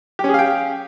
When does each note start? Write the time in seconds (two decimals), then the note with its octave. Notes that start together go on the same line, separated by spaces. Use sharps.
0.19 G4
0.24 C#4
0.29 G#4
0.34 F5
0.39 G5